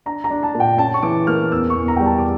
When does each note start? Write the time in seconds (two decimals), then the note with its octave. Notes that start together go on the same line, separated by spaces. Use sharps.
0.06 D4 A#5
0.24 A#5
0.30 D4
0.43 A5
0.55 A#2
0.60 G5
0.78 C#4 A5
0.94 C#6
1.02 E3 D6
1.27 A#3 F6
1.51 E2 E6
1.70 C#6
1.76 E2
1.88 A#5
1.96 G3 G5
2.06 A5
2.18 D6